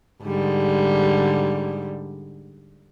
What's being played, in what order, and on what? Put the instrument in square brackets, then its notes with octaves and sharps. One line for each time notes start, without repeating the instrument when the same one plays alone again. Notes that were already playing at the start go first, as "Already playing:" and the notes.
[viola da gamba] G#2 D3 G3